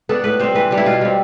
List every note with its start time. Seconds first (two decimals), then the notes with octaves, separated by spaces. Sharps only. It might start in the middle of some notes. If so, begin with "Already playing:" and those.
0.09 B3 D4 A4
0.24 A2 B4
0.39 G3 C4 C5
0.54 E3 B4
0.71 G3 D4
0.78 E4
0.86 B2 F4
1.01 G3 C4